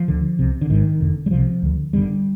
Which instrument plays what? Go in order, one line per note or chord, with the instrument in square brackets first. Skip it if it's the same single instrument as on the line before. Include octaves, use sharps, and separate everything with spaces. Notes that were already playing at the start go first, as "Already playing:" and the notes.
Already playing: [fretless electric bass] F3
D2 D3
C2 C3
D3
G#1 G#2 D#3
F1 F2 D3
G3
C2 C3 F3
D2 D3
G1 G2 D3 G3